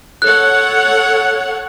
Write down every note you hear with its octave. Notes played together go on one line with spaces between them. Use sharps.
A4 C#5 F#5 F#6